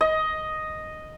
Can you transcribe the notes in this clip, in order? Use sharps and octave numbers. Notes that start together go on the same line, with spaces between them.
D#5